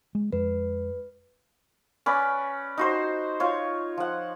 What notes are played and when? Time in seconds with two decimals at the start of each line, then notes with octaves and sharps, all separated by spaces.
0.15 G#3
0.33 F2 G#3 B4
2.06 C#4 B4 D5
2.78 D#4 F#4 C5
3.40 F4 C#5
3.97 F3 F#5